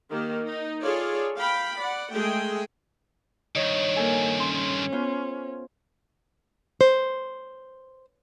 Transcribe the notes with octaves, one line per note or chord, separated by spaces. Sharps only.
D#3 A#3 G4
D#4
F4 G#4 A4 C#5 D5
F5 G5 B5
D5 F#5
G#3 A3 G#4 G5
G2 D#3 C#5 D#5
A#3 A4 G#5
C#4 C6
B3 F4 C5
C5